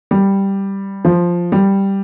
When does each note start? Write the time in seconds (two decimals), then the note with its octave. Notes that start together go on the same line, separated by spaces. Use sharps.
0.11 G3
1.05 F3
1.52 G3